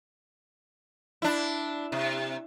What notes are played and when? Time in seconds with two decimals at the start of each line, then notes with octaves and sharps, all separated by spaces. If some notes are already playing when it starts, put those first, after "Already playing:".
1.22 D4 E4
1.92 C3